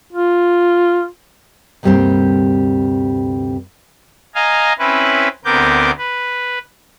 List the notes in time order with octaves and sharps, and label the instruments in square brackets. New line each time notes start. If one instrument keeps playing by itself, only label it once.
[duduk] F4
[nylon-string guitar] D2 G2 C3 G3 A#3 C4
[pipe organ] D#5 F5 G#5 A#5
C4 C#4 E4 B4
D2 B3 C4 A#4 D6 G6
B4